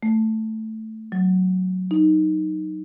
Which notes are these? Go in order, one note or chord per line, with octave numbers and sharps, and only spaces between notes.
A3
F#3
D#4